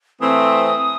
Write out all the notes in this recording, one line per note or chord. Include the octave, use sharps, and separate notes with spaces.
E3 A3 C4 D#6